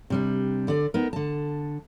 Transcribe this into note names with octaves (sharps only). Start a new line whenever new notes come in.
C3 G3 D4
D3 D5
B3 D#4 A#4
D3 A5